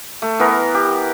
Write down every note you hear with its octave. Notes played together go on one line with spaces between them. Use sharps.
A3
E3 B3 A#4
G4